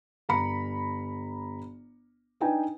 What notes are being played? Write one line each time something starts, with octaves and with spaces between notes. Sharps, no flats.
G1 A#5 B5 C#7
D4 D#4 B4 G5 G#5